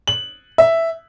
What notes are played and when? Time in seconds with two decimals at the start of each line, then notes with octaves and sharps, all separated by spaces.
0.08 F#7
0.58 E5